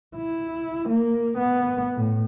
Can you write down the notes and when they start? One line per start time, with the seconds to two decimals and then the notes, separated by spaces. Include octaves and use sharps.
0.16 E4
0.89 A#3
1.38 B3
1.96 A2